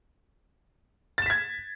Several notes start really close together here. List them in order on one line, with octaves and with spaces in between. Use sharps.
A6 E7 B6 G#6